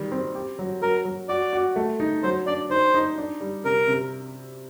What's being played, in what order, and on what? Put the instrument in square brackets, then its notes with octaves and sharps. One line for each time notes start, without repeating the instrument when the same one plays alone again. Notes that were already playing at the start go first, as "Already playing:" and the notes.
Already playing: [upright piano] D#3 G3
C4
G4
F#3
[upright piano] F#3 [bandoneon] A#4
[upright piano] F#3
[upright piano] F#4 [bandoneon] D5
[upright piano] F#4
A3
D#4
[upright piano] F#3 [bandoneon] C5
[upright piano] D4 [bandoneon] D5
[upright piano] D#4 [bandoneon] C5
[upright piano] D#4
D4
G3
[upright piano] C3 [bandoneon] A#4
[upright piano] C3